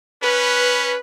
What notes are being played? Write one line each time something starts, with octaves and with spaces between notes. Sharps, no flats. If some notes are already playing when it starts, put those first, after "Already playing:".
C#4 B4